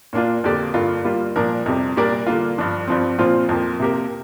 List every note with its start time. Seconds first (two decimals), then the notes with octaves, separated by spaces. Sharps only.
0.13 A#2 A#3 D4 F4
0.44 F2 D3 A#3 G4 D5
0.74 G2 D3 A#3 F4
1.04 G3 A#3 F4
1.36 A#2 F3 D4 A#4
1.66 F2 C3 G3
1.97 A#2 G3 D4 A#4 D5
2.27 D3 A#3 F4
2.58 G2 F3 D4
2.87 G2 F3 C4
3.19 A#2 F3 C4 F4 C5
3.49 F2 F3 A#3
3.80 C3 A#3 G4 A#4